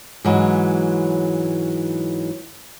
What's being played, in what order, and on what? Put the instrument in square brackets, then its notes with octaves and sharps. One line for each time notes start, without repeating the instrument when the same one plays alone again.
[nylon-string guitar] G#2 E3 F#3